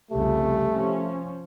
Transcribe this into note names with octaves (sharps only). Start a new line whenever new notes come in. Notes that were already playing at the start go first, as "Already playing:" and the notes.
C2 F2 C#3 A3 G4
F3 C#4